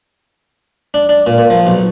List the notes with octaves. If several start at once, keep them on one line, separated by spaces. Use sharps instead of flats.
D4
D4
A#2
A#2
F3
B1